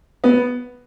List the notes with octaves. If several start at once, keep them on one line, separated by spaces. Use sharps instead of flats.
B3